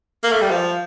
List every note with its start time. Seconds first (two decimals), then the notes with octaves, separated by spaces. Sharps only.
0.23 A#3
0.32 A3
0.41 G3
0.51 F3